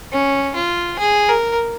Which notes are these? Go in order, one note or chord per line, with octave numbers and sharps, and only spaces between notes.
C#4
F4
G#4
A#4